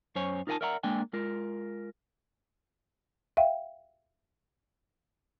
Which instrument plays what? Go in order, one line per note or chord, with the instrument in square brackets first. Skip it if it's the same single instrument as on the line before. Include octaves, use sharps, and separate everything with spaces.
[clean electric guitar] F#2 C#4 C5 C#5 G#5
D#4 F4 A#4 F5 G#5 A5
A#4 D5 E5 F#5 G#5 A#5
G#3 A#3 D4 G5 G#5
G#3 F4 A#4
[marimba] E5 F5 G5